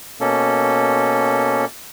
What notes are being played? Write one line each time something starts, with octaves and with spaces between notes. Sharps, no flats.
B2 A#3 C#4 A4